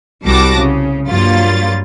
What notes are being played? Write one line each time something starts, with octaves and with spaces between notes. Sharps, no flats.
C2 G3 F#4 A5 D6 A#6
C#3
G2 F#3 A#3 F4 A6